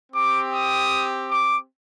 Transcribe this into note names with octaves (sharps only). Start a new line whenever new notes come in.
C4 G4 D6
D#6
D6